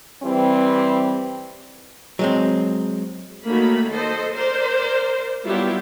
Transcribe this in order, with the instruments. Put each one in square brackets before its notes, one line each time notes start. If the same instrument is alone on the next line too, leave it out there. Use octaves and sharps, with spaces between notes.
[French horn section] E3 G3 C4
[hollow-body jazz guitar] F#3 G#3 C4
[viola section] D#3 F#3 A3 A#3 B5
A4 C5 D#5
A#4 C5 D5
F#3 G3 B3 E4 F4 G4